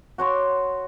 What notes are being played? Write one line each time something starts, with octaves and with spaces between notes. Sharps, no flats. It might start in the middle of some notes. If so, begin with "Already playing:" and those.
F#4 C#5 C6 D6